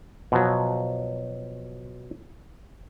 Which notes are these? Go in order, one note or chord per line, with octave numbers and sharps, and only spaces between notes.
B2 F3 F#3